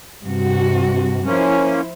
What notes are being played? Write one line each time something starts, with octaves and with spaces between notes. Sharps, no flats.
G2 C3 F#4
F3 A#3 C#4 E4 C5